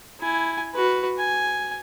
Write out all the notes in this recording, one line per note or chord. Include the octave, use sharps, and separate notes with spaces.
E4 G#5
F#4 B4
G#5